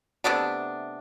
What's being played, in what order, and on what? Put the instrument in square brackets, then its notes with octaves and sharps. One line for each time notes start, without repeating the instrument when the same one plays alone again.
[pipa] C3 A3 B3 D4